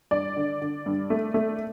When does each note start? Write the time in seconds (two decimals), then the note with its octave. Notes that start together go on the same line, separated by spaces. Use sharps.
0.11 G2 D5
0.36 D3
0.62 D3
0.86 G2
1.10 A3
1.34 A3